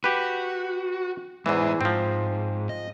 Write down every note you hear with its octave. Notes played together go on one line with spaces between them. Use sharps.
F#4 G4 B4
E2 E3 G#3 C5 D#5
G#2 F3 C4
D#5